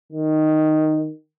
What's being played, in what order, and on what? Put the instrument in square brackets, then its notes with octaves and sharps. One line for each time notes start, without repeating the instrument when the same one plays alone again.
[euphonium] D#3